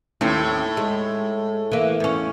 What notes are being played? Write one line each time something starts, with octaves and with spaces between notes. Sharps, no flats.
D#2 A2 C4 C#4
G#3
E3 A#3
E2 C#4